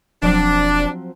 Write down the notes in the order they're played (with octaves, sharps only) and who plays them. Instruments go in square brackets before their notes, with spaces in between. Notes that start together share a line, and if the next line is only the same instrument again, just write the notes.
[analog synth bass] E1 [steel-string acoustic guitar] F3 F#3 C4 [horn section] D4